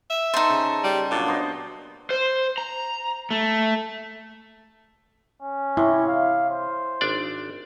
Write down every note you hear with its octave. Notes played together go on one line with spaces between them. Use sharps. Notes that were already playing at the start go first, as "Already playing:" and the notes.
E5
D#4 A4 C5
C#3
G3
A#2 F#3 D4
B3 C5 D#5
C5
A#5
A3
C#4
C3 E4 C#5
F5
C5
G#1 D4 D5